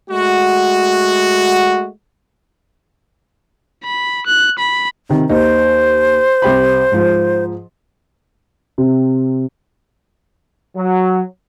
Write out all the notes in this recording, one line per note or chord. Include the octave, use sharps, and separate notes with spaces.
G#3 A3 F#4
B5
F#6
B5
C3 D#3
D#2 D#4 C5
C2 G4 B5
G#2 F3
C3
F#3